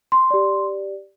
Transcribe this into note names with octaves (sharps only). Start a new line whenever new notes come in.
C6
G4 D5